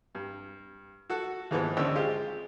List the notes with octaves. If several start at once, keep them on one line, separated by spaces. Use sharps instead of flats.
G2
F#4 A4 F#5
D#2 G#2 E3 F3 B3
G#1 D2 C#4 D4 C5 E6
G#3 F4 G4 C5